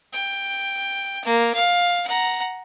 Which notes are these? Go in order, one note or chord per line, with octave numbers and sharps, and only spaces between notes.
G5
A#3
F5
F#5 A#5